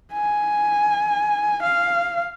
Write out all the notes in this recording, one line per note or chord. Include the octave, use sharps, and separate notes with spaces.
G#5
F5